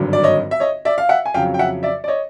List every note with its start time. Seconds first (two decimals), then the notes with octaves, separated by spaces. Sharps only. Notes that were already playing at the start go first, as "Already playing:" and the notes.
Already playing: G#1 G2 D3 F#3
0.13 D5
0.23 C#5 D#5
0.51 E5
0.60 C#5 D#5
0.85 D5 E5
0.98 F5
1.09 E5 F#5
1.26 G#5
1.34 F2 C#3 F#3 F5 G5
1.54 G5
1.59 E5 F#5
1.83 D5 E5
2.04 D5
2.08 C#5 D#5